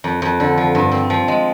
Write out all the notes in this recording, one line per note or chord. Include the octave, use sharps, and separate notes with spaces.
F2
F2
D3
F3
G2
C4
F3
G#3